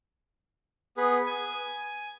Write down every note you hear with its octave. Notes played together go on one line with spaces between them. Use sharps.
B3 G#4 B4
G#5